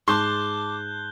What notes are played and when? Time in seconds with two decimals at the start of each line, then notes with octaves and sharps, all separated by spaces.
0.08 G#2 A5 C6 D6 F#6 G6 G7